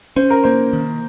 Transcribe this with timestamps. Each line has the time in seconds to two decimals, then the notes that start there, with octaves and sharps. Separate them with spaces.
0.16 C#4 C5
0.31 A#4
0.44 A#3 C5
0.73 D#3